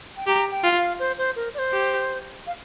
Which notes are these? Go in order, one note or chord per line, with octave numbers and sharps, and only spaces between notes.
G5
G4 A#5
G5
F4
F5
C5
C5
A#4
D5
C5
G4
F5